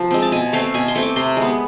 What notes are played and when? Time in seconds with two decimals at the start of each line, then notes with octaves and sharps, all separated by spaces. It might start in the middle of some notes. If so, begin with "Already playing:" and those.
Already playing: C3 F3
0.11 G#3 C4
0.22 A5
0.32 B2 G#5
0.53 A3 C4 F5
0.74 B2 G#5
0.88 C6
0.95 A3 C4
1.02 D6
1.16 C3 C6
1.37 G#3 B3